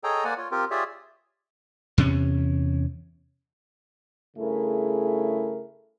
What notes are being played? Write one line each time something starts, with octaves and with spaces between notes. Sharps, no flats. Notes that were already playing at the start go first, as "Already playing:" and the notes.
G#4 A4 C#5 D#5 G5 A#5
A#3 C5 D5 F#5 G#5
F4 C#5
C4 F4 G4 A#4
F4 G4 G#4 C#5 D5 E5
E2 C3 C4 C#4
G2 C#3 A3 E4 G#4 A#4